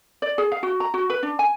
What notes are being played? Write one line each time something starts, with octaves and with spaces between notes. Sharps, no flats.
D5
G#4
F5
F#4
A#5
F#4
B4
D4
G#5